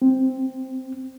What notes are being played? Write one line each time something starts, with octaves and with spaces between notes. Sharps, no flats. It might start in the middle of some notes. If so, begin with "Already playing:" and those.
C4